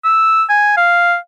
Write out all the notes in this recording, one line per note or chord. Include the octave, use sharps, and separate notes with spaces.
E6
G#5
F5